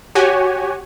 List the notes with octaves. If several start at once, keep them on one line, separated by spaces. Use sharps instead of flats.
F#4 G4 C#5 G#5